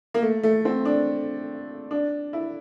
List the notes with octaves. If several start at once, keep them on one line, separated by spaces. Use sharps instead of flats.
A#3
A3
A3
C4
D4
D4
E4